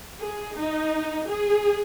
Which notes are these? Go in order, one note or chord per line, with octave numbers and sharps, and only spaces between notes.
G#4
D#4
G#4